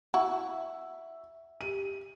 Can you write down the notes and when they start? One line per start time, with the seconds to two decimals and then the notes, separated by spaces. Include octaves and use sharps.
0.14 E4 F#4 E5
1.61 G4 D#7